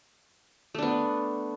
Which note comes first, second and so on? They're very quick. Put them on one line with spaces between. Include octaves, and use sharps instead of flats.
A3 D4 B3